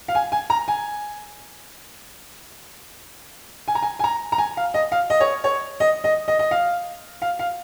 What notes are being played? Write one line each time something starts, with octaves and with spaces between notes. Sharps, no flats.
F5
G#5
G#5
A#5
G#5
G#5
A#5
G#5
G#5
A#5
A#5
G#5
F5
D#5
F5
D#5
C#5
C#5
D#5
D#5
D#5
D#5
F5
F5
F5